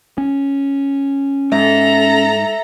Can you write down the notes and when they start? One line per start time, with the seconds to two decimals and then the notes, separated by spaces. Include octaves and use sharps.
0.18 C#4
1.52 G#2 A4 E5 A#5